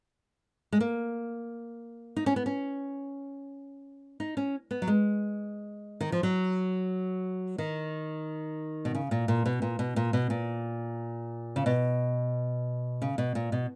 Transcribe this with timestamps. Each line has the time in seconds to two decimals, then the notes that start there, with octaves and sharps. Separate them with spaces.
0.72 G#3
0.81 A#3
2.16 D#4
2.26 C#4
2.36 B3
2.46 C#4
4.20 D#4
4.37 C#4
4.71 B3
4.82 F#3
4.87 G#3
6.01 D#3
6.12 F3
6.23 F#3
7.58 D#3
8.85 B2
8.95 C#3
9.11 A#2
9.28 A#2
9.46 B2
9.62 A#2
9.79 B2
9.96 A#2
10.13 B2
10.30 A#2
11.56 C#3
11.66 B2
13.02 C#3
13.18 B2
13.35 A#2
13.52 B2